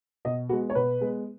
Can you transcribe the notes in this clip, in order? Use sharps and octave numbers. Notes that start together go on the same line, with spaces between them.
B2 D#5
G#3 B3 F#4
C#5
B2 B4
G#3 B3